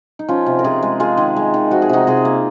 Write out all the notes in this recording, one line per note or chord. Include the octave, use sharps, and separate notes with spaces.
D#4
F3 C#4 F4
C3
A#4
C3 F4 G#4
G#3
G#3 F4 G#4
D#3
G#3
D#3
F3 F#4
G#4
C3 D#4 F#4
C3 F4 G#4
A#3